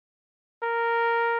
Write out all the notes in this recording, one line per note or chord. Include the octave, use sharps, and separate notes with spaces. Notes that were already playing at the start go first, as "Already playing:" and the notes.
A#4